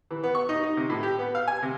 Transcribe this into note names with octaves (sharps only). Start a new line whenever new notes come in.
E3
B3
C#6
D#4
D#4
C3
A2
G4
B3
F5
G#5
C3